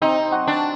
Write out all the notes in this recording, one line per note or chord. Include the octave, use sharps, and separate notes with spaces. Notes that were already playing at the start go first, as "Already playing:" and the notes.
C3 C4 D#4
F#3 F#4
D4